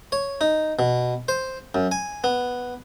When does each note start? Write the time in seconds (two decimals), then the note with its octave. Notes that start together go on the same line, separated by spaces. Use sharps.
0.12 C#5
0.41 D#4
0.79 B2
1.28 C5
1.75 F#2
1.92 G#5
2.24 B3